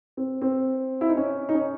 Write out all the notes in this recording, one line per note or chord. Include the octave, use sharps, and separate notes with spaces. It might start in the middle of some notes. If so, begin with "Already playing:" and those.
C4
C4
E4
D#4
C#4
D#4
C#4